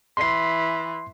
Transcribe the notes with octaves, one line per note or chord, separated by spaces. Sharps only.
E3 C6 C7